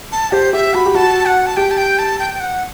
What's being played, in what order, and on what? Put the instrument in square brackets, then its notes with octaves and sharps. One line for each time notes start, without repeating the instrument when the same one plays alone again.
[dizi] A5
[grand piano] G4 [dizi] C5
[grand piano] G4 [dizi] E5
[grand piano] F#4 [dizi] B5
[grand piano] G4
[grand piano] F#4 [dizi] A5
[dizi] F#5
A5
[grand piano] G4 [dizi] G5
[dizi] A5
G5
A5
G5
G5
F#5